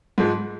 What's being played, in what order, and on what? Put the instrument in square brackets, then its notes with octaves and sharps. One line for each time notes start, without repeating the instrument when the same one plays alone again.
[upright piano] G#2 F3 G#3